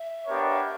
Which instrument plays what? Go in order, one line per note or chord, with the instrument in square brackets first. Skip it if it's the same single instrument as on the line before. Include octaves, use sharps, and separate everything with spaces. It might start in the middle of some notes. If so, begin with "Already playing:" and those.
Already playing: [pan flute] E5
[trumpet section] B3 D4 G4 A#4 C#5